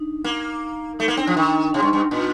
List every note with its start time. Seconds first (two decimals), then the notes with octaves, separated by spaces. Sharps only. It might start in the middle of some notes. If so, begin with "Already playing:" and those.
Already playing: D4 D#4
0.24 A#3
0.99 A3 D#4
1.08 A#3
1.17 C4 D4
1.27 F3
1.37 D#3 D#4
1.74 C3
1.82 G2
1.93 G2
2.11 A#2